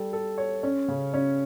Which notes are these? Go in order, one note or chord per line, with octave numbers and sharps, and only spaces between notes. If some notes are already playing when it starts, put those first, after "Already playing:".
Already playing: G3 A4
A4
C#5
C#4
C#3
C#4